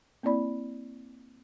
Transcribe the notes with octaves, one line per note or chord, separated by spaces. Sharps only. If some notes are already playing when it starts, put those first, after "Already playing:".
A#3 C4 E4 D5 B5